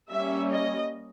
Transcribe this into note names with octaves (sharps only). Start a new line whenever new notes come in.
G3 A#3 C#4 E5
D#5